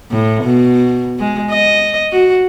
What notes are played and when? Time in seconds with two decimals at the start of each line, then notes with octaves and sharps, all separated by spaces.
0.11 A2
0.43 B2
1.19 G#3
1.51 D#5
2.12 F#4